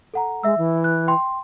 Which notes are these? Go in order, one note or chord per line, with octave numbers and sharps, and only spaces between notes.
A4 F#5 A#5
G#3 E5 E6
E3
F#6
G5 C6